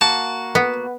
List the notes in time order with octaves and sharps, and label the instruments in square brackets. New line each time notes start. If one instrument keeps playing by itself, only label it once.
[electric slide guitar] A#3 F#4 [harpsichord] A5
[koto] B3